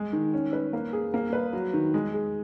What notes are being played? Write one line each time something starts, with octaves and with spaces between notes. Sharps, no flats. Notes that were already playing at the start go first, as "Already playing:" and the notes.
Already playing: G#3
D#3
C#4
B4
A#3
G#4
A#3
B4
F#3
D#3
G#3
G#4